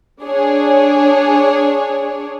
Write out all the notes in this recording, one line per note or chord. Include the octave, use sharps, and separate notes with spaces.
D4 G#4 C#5